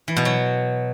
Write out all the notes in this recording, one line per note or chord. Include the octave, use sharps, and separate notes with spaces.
E3
B2
F#3